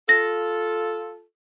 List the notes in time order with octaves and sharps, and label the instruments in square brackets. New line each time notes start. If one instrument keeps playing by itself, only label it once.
[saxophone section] F4 A4 [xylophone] A#6